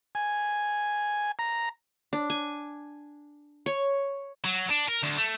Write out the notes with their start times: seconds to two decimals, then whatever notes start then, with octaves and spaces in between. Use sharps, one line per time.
0.15 G#5
1.39 A#5
2.13 D4
2.30 G#5
3.66 C#5
4.44 F#3
4.70 D4
4.88 A#4
5.03 D2
5.17 A3